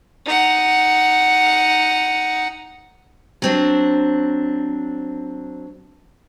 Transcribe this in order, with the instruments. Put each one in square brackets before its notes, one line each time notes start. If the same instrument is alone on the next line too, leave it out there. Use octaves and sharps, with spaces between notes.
[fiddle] D#4 F#5
[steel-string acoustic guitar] F#3 C4 D4